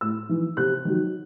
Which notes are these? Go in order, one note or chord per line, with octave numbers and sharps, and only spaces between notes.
A2 E6
E3
C3 F#6
D#3 F#3